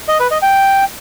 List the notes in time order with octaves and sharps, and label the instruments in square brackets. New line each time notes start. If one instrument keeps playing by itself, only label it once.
[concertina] D#5
B4
D#5
G5